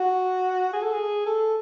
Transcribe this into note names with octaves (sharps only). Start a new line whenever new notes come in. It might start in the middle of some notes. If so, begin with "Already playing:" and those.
Already playing: F#4
G#4
A4
G#4
A4